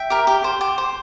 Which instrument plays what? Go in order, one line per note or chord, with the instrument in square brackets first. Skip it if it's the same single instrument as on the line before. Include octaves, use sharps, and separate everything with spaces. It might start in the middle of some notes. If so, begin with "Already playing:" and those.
Already playing: [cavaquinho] E5 G5
G4 A#4
G4
C5
G4
C5